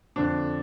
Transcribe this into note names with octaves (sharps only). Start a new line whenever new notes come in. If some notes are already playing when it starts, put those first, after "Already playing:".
F2 D3 D4